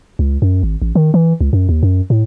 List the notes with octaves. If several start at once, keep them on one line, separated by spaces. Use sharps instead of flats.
C#2
F#2
G#1
A1
D#3
E3
C#2
F#2
D#2
F#2
A2